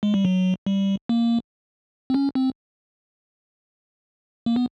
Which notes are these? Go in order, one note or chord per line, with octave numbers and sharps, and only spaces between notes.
G#3
G3
F#3
G3
A#3
C4
C#4
C4
A#3
B3